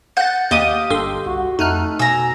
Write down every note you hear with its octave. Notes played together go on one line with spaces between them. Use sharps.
F#5 G6 A6
D#2 G4 D#5 F5 D#6
G1 G2 A4 C6
C2 F#4
F2 A3 D#4 F6 F#6
B2 G#5 A#5 E6